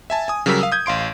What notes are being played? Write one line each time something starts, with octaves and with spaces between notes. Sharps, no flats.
E5 G#5 A5
G#5 D#6
C#3 F#3 G3 A#4 E6 B6
F5 D#6 E6
D#6 G6 G#6
A1 F5 C6 D7